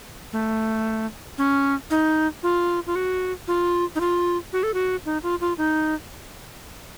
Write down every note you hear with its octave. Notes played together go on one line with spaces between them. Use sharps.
A3
C#4
D#4
F4
F4
F#4
F4
D#4
F4
F#4
A4
F#4
D#4
F4
F4
D#4